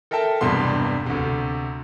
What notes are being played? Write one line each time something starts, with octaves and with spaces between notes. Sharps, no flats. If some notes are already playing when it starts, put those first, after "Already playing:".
A4 A#4 E5 G5 A5
E1 G2 C3 B3 C6
D2 C3